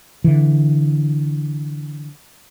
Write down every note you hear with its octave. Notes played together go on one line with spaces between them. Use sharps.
D3 E3